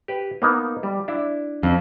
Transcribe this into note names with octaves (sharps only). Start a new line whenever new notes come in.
G4 B4
A#3 B3 D#4
G3
D4 E4
F2